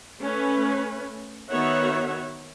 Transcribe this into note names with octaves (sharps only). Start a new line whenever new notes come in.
A3 C#4 B4
D#3 B3 F#4 C#5 E5 F#5